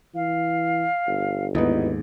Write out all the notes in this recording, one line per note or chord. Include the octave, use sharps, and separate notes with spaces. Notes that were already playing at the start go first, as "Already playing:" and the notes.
E3 F5
G1
D#2 G#2 B3 D#4 E4